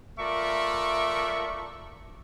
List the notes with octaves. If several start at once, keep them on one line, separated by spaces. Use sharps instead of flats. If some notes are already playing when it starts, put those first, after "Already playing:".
A3 F4 A#4 D5 E5 C#6